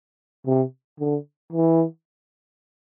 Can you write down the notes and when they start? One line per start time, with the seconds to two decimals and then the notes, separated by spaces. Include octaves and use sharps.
0.47 C3
1.00 D3
1.53 E3